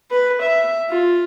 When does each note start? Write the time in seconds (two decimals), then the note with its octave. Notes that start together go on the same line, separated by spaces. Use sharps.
0.11 B4
0.42 E5
0.90 F4